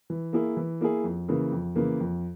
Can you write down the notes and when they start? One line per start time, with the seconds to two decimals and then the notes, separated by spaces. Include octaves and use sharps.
0.10 E3
0.33 A#3 E4 G#4
0.57 E3
0.81 A#3 E4 G#4
1.04 F2
1.28 C#3 E3 A#3
1.52 F2
1.75 C#3 E3 A#3
2.00 F2